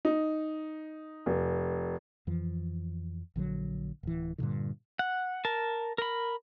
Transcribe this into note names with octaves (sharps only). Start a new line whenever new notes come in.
D#4
F1
F2 E3 F3
A#1 D3 F3 F#3
D1 E3
G2 A#2 D3 D#3
F#5
A#4 A5
A#4 B5